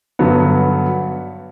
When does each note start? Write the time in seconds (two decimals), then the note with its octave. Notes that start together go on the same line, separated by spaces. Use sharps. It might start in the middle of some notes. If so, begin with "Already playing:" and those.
0.19 G2 D3 F#3 B3